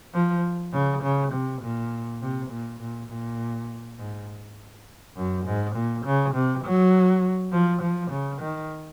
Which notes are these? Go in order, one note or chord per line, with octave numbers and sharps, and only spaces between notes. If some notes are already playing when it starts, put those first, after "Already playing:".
F3
C#3
C#3
C3
A#2
C3
A#2
A#2
A#2
G#2
F#2
G#2
A#2
C#3
C3
F#3
F3
F3
C#3
D#3